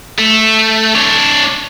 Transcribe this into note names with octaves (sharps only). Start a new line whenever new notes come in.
A3
D4 C#5